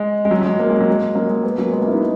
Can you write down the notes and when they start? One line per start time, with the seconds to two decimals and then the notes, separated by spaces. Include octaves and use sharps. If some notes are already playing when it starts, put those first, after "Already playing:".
Already playing: G#3
0.25 G#3
0.31 F#3
0.42 F#3
0.45 G#3
0.59 A#3
0.70 G#3
0.80 F#3
0.90 G#3
1.15 F#3 A#3
1.30 G#3
1.43 G#3 B3
1.58 F#3 A#3
1.72 G#3 B3
1.82 A#3 C#4
1.87 E4
1.91 B3 D#4